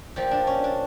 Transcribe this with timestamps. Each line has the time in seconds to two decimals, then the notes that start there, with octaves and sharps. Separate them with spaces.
0.16 A#2 F3 G4
0.31 D4
0.47 C#4
0.64 D4